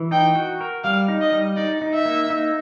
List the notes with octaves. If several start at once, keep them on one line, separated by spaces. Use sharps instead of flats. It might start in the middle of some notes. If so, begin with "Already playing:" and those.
Already playing: E3
D#4 G5
F#4
A#4
G3 F5
D#4
D#5
G3
D#4 D5
D#4
E5
A#3
D#4